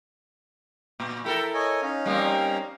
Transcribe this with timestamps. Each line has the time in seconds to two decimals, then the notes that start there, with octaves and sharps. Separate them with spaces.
1.00 A#2
1.24 E4 A4 A#4 G5 B5
1.54 C#5 D#5 G#5
1.82 C#4 D#4 F5
2.06 G3 A#3 C4